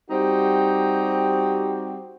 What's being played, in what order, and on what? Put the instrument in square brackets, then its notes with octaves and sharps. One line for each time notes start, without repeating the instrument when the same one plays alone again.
[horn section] G3 C4 D#4 F#4 G4